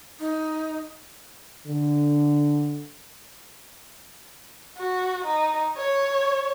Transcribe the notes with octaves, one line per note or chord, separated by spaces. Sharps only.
D#4
D3
F#4
D#4
C#5